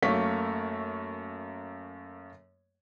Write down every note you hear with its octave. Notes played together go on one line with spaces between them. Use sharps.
F#2 A3 A#3 C#5 B6